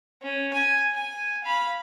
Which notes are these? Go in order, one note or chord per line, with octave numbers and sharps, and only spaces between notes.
C#4
G#5
G#5
F5 B5